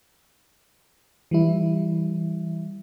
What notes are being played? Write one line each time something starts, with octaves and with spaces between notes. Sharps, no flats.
E3 G3 E4